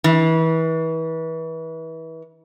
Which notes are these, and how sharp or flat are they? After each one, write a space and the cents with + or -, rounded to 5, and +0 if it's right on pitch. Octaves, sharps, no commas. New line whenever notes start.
E3 -30